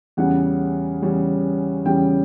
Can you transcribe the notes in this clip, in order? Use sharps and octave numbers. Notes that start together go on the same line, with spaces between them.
E2 C#3 G3 C#4 F#5
E2 C#3 G3 C#4
E2 C#3 G3 C#4 G5